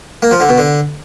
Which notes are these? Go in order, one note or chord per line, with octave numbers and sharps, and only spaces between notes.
A#3
F3
D3
B2
D3